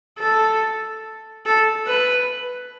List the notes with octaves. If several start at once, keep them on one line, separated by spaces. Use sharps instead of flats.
A4
A4
B4